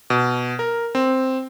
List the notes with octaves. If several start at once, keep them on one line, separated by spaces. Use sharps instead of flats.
B2
A#4
C4